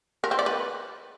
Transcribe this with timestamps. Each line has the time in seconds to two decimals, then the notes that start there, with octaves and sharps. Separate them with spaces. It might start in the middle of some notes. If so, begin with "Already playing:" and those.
0.24 A#4
0.31 C4
0.39 D5
0.46 B4